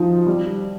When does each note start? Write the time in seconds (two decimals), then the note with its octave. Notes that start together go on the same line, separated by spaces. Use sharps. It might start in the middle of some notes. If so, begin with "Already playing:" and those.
Already playing: F3 D#4
0.27 G3